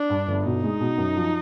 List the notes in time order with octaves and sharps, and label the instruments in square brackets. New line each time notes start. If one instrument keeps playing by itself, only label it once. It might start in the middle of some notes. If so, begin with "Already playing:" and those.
Already playing: [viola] D4
[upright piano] G2
G1
[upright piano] B2 [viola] D#4
[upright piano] G#3
B2
F#2
F3